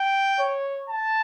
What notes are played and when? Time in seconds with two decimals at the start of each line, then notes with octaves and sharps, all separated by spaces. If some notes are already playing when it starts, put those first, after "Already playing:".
Already playing: G5
0.39 C#5
0.89 A5